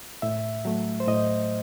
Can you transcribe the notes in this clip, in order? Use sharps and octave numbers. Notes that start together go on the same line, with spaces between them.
A2 E5
F#3 A3
C5
A2 D#5